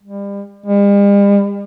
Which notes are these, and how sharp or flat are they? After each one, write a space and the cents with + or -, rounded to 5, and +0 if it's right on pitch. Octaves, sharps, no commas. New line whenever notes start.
G3 +35
G3 +45